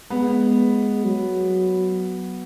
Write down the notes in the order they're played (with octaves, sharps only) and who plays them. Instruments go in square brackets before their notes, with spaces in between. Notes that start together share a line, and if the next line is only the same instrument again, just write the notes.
[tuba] G#3 [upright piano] B3
[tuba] F#3